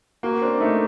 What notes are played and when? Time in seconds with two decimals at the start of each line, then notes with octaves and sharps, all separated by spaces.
0.23 A#3 F#4
0.41 C4 D4
0.60 A3 D#4